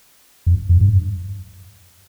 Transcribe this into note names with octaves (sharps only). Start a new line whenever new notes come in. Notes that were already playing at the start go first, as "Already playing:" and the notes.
F2
F2
G2